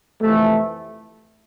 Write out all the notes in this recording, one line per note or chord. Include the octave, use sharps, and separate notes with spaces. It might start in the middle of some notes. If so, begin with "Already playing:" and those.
F2 C3 E3 A3